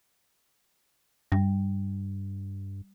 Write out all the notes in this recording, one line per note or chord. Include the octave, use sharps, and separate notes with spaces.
G2 G3